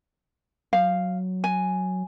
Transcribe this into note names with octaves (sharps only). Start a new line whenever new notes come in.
F#3 F5
G#5